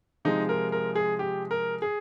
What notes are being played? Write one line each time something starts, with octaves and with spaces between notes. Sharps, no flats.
C3 F3 G#3 D#4
A#4
A#4
G#4
G4
A#4
G#4